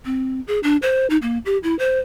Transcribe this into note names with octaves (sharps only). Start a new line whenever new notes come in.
C4
G#4
D4
C5
D#4
A#3
G4
E4
C5